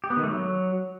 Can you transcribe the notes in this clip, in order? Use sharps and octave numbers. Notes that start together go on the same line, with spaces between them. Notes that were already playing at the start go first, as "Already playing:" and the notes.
G4
B3
D#3
A3
F#3